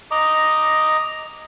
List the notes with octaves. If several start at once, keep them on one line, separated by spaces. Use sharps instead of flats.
D#5 A#5 D6